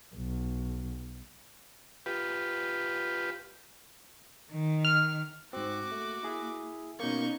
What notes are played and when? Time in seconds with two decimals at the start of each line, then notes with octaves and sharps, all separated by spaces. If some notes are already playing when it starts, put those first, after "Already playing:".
0.16 B1
2.06 F4 G4 B4
4.51 D#3
4.85 F6
5.53 G#2 C4 F#4 D6
5.91 A3 A#3
6.23 E4 G#4 E5
7.00 B2 A#3 B3 C#4 D#4 C#6 G6